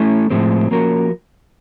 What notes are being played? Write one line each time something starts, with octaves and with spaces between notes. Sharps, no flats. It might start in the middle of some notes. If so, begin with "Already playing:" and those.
Already playing: A3 C#4 E4
A2 F3 G#3 C4
F3 A#3 C#4 F#4 A#4